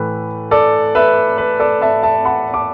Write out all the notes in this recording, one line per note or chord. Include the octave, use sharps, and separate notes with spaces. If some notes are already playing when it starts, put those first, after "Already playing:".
Already playing: A2 E3 A3 B4
A4 D5
B4 E5
B4
A4 D5
E5 A5
E5 A5
F#5 B5
A5 D6